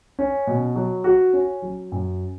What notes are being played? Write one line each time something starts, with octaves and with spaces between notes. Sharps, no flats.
C#4
B2
F#3
F#4
C#4
F#3
F#2